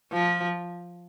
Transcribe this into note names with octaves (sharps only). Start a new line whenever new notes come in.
F3